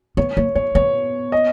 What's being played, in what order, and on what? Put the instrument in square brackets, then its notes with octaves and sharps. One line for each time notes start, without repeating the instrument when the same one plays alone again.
[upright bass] B3 [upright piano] C#5
[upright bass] A#3 [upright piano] C#5
[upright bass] B3 [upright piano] C#5
[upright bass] B3 [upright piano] C#5
[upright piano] D#5